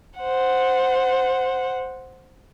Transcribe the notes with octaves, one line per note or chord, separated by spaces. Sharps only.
C5 F#5